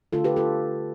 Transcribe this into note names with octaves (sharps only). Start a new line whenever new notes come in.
D3 A3 D4 F4 A4
G4 B4
F4 A4